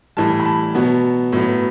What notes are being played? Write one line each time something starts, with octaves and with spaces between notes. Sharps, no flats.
A2 E3 G3 A5
B5
A5
B2 F#3 B3
A2 F#3 B3